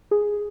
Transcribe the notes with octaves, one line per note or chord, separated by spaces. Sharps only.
G#4